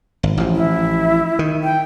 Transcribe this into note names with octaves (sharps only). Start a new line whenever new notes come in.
G#1
A1 F3
E4
D#3
G5